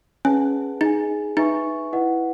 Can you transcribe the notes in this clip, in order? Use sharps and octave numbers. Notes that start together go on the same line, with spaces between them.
C#4 G#4 B4 D#5 F#5 A5
D#4 G#4 D#5 G#5
D#4 B4 E5 G#5 C#6
E4 B4 D#5 F#5